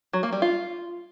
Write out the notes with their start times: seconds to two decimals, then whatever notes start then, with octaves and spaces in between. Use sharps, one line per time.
0.13 F#3
0.23 A#3
0.32 G3
0.42 F4